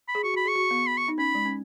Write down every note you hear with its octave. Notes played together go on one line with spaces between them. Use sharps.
B5
G#4
F#4 C#6
F#4
B5
G#4
C#6
F#4
B3
B5
C#6
D#4
C#4 B5
G#3
C#4